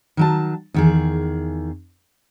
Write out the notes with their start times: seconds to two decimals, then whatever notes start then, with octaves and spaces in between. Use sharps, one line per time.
0.17 D#3 F#3 A5
0.74 E2 D#3 G#4